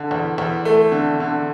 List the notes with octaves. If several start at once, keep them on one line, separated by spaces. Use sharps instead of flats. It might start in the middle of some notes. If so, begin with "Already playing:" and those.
Already playing: D3
E2
E2
A3
D3
D3